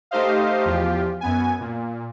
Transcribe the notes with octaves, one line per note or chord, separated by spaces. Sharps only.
A3 D#4 G4 C5 D#5 F5
E2 F3 F4 G4
F#2 B3 G#5
A#2